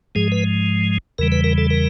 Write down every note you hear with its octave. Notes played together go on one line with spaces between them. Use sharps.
G#2 F3 G#3 G#4
B4
E2 C#3 E3 G3 A#4
B4
A#4
A4
A#4